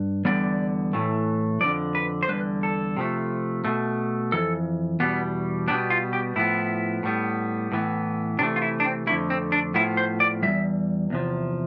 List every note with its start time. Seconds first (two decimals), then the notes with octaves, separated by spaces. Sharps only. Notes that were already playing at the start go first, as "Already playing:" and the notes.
Already playing: G2
0.25 E2 D3 G3 B3 D5
0.93 A2 E3 A3
1.61 F3 D5
1.64 F2 D3
1.95 B4
2.23 C5
2.29 E2 D3 G3 B4
2.63 A4
2.97 C3 F3 A3
3.65 B2 A3
4.32 F2 E3 A4
5.00 E2 B2 G3 B3
5.68 B2 G3 B3 D4
5.90 F4
6.13 G4
6.36 A2 F3 B3 E4
7.03 A2 G3 B3
7.72 A2 E3 B3
8.39 C3 E3 A3 D4
8.56 F4
8.62 E4
8.80 D4
8.84 C4
9.07 F2 D3 A3 E4
9.30 C4
9.52 D4
9.74 A2 F3 B3 E4
9.97 C5
10.20 D5
10.42 E2 B2 G3 E5
11.10 E2 C3 F3